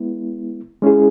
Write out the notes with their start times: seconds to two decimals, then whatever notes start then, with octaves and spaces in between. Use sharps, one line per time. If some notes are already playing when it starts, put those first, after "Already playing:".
Already playing: G#3 B3 E4
0.82 G#3 C#4 E4 G#4